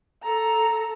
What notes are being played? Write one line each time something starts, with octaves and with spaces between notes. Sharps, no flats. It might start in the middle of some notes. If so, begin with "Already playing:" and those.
A4 A#5